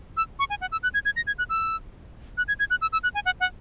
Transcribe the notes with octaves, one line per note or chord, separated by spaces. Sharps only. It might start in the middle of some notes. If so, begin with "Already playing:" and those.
E6
C#6
G#5
F#5
E6
F#6
G#6
G#6
A#6
G#6
F#6
E6
F#6
G#6
G#6
F#6
E6
E6
F#6
G#5
F#5
F#5